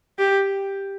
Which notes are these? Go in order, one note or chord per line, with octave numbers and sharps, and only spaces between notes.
G4